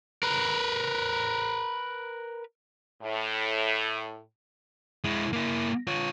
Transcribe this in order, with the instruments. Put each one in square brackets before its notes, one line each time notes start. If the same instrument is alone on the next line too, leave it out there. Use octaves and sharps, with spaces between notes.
[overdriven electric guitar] A#4 B4
[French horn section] A2
[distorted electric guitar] G#3 E4
A#3 E4
F4 C#5